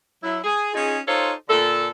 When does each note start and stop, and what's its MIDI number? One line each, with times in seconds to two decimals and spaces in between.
0.23 0.38 54
0.23 0.38 64
0.44 0.73 68
0.74 0.98 61
0.74 0.98 63
0.74 0.98 65
0.74 0.98 68
1.07 1.33 63
1.07 1.33 65
1.07 1.33 69
1.07 1.33 72
1.07 1.33 73
1.49 1.88 46
1.49 1.88 50
1.49 1.88 69